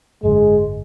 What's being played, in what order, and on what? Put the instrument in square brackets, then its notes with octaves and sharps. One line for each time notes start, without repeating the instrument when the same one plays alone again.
[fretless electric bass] G#1 F#2 D3 [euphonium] G#3